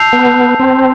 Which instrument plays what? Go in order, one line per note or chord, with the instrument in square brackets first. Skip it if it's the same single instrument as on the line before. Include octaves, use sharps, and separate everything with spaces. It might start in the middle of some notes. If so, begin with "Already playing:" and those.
Already playing: [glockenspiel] A5 E6 G6 C7 F7
[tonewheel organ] B3
C4